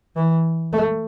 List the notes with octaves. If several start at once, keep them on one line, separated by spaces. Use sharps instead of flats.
E3
A3